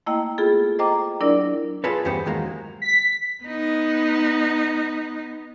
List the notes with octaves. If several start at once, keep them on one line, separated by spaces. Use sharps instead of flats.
A3 A#3 E4 D#5 G5
B3 F4 G#4 A4
C5 D#5 G5 A#5 D6
F#3 D4 E4 A#4 D5
F4 G#4 A4 B4 C#5
E2 G2 B3 C#4 G4 C5
E2 D#3 F#3 G#3 A#3
B6
B3 D#4